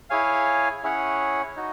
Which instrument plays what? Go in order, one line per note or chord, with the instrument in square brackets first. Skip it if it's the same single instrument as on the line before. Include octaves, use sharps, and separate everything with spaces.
[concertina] E4 G#4 C#5 F5 G#5
C#4 E4 G#4 C#5 F#5
D#4 F#4